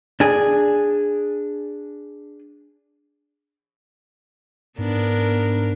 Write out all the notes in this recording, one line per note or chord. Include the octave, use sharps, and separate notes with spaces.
D4 G#4
G#2 B3 D4 A#4